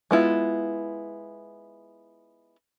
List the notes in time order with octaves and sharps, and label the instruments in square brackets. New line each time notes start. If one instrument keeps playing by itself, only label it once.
[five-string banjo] G#3 B3 E4 F4